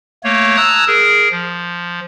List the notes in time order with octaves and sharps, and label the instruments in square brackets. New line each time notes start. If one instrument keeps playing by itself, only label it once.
[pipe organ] A3 A#3 C#5
A5 A#5 D#6 E6 F#6 G#6
G#4 A#4
F3